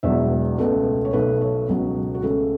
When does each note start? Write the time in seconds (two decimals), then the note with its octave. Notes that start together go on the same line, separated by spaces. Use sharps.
0.03 E1 E2 B2 F#3 E5
0.58 C#2 B2 A3 B4
1.05 C#5
1.13 B1 B2 A3 B4
1.41 C#5
1.69 C#2 B2 F#3
2.14 F#4
2.22 C#2 C#3 A3 A4